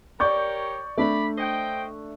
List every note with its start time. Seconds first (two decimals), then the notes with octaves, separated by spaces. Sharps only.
0.20 G4 A#4 C#5 D5 C#6 G6
0.98 A3 D4 D5 B5
1.37 C5 D#5 G5